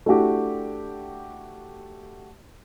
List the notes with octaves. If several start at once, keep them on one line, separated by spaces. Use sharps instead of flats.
A3 D4 E4 F#4 G4